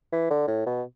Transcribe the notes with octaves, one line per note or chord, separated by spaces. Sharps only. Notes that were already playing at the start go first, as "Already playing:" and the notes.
E3
D3
A2
B2